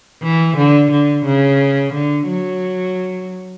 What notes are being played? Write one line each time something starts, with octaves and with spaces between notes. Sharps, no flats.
E3
D3
D3
C#3
D3
F#3